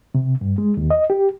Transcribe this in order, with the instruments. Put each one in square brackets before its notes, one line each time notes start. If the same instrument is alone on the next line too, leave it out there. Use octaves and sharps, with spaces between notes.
[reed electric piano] C3
G2
G#3
D#2
D#5
G4